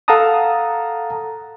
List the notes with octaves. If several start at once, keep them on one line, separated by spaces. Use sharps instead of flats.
A4 F5 F#5 A5 A#5 D#6